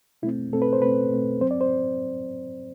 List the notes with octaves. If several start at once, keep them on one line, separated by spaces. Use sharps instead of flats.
B2 A3 C4 E4
B2 A3 C4 A4
B4
C5
B2 A3 C4 B4
B2 A3 C4
F#2 F#3 C4 C5
D5
C5